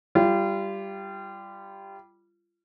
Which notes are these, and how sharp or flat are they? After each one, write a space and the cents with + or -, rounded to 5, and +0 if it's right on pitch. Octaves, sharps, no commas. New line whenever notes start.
G3 +0 F4 -30